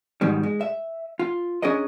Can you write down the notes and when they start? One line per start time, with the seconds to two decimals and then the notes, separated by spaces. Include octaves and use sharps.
0.21 G#2 B2 D#3 G3
0.43 G#3
0.61 E5
1.19 F4
1.62 C#4 D4 G#4 A#4 D#5